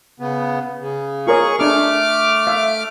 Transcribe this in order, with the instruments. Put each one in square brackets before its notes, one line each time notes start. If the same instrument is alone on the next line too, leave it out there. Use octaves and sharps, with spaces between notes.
[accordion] C#3 B3
C#3
[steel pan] F4 A#4 C#5 [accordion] G#4 C#6
[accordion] A3 D6 F6 [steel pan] D4 G#4
[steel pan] E5 F5